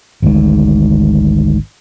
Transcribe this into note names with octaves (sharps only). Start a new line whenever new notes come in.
G#1 D2 G#2